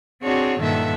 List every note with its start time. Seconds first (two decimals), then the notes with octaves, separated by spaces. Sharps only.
0.21 C4 D4 F#4 G#4 C#5
0.59 G2 A#2 D#3 A4 E5 F#5